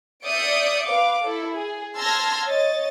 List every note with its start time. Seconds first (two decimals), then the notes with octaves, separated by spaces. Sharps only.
0.25 D5 E5 D#6 G6 C#7 D7
0.87 B4 F5 D6
1.23 E4 A4
1.57 G#4
1.96 A5 C6 E6 F6 G#6 A#6
2.47 C#5 D#5 A6